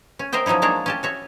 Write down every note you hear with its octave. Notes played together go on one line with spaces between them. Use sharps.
C#4
A#4 C5 D#5 E5 G5
F3 F#3 C#4 D#4 E4
G#3 A#3 D4 C#5
C#4 G4 A5
F#4 C#5 E5